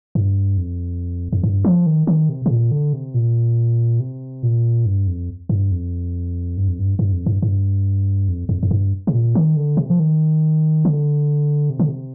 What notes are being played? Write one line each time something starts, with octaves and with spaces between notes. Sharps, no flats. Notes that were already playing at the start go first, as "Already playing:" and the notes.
G2
F2
F2
G2
F3
D#3
D#3
C3
C3
A#2
D3
C3
A#2
C3
A#2
G2
F2
G2
F2
G2
F2
G2
G2
F2
G2
G2
F2
F2
F2
G2
C3
A#2
D#3
D3
C3
F3
D#3
D3
C3
D3
C3